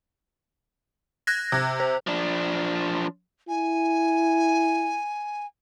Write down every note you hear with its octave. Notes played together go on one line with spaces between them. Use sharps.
F#6 G#6 A#6
C3
C5
F3 D4
E4 G#5